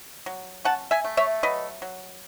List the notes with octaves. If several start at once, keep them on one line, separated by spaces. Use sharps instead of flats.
F#3
C#4 F#5 A5
E5 G#5
A3
C#5 E5
F#3 B4 D#5
F#3